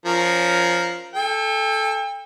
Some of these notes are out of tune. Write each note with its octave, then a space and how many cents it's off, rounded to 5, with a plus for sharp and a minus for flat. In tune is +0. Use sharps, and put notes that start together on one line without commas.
F3 +0 C#4 +15 A#4 +0
A4 -10 G5 +40